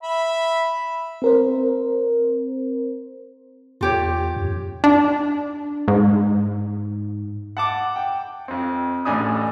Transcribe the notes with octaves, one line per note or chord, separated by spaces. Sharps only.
E5 B5
C4 A#4 C5
E2 F4 G4 C#5
F#2
D4
G#2
F#5 A5 D6
G5
F2 C4
A1 A2 E3 C#4 D4 D#6